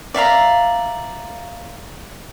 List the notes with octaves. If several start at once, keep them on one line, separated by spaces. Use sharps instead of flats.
D5 E5 F5 A#5